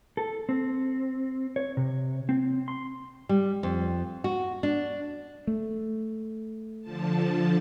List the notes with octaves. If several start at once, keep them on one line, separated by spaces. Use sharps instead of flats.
A4
C4
C#5
C3
C4
C6
G3
F2
F#4
D4
A3
D3 F3 A5